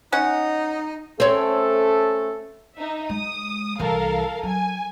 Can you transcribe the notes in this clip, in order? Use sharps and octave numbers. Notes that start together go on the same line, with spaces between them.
C#4 D#4 F#5
A3 C4 C#4 A4 C#5
D#4 E5
G#3 D#6
C2 E3 A4 A#4 F5
F#3 G#5